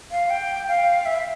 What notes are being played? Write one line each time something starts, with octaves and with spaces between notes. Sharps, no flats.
F5
G5
F5
E5